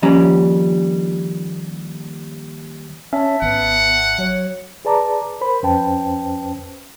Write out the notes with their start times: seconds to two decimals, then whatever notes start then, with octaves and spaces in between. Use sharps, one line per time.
0.02 D#2 F3 G3 C#4 A#5
3.13 C#4 C#5 E5 A5
3.42 G#1 B3 F#5
4.18 F#3 C#5
4.85 G#4 B4 D5 A5 A#5 D6
5.41 A#4 C5 B5
5.63 F2 C#4 B4 C5 G5 A5